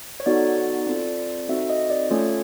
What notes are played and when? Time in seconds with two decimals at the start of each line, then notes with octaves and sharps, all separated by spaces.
0.20 C#5
0.26 B3 D#4 F#4 A4 D5
0.87 C4 F4 A4
1.49 C4 D#4 F#4 A4 E5
1.69 D#5
1.90 D5
2.10 A3 C#4 F4 A4 C#5